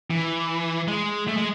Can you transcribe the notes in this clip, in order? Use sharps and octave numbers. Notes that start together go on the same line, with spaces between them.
E3
G#3
A3
G#3